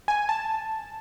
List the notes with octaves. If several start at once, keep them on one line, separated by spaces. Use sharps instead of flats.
G#5
A5